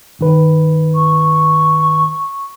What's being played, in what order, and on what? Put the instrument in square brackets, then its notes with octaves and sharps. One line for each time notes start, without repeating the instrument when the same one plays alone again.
[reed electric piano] G2 D#3 B4
[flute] C#6